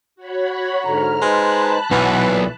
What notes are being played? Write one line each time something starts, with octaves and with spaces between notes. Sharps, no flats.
F#4 C#5 B5
G#2 D3 A#5 F6
G#3 D#4 B4 C5 A5 B5 F#6
B1 E3 F#5
A#2